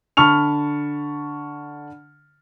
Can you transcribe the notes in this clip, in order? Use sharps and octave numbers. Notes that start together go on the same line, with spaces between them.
D3 A5 B5 C#6 F6 F7